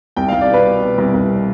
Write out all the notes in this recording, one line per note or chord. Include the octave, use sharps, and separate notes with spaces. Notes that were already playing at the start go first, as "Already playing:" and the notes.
C2 G5
C2 F5
D5
B2 B4
B2
B2
C2
C2